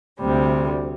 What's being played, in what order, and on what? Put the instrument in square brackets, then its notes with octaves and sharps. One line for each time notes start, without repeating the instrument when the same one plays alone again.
[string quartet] D2 C3 G3